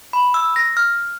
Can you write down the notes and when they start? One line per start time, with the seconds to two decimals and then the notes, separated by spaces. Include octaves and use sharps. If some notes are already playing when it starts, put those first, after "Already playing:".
0.13 B5
0.34 E6
0.56 A#6
0.77 F6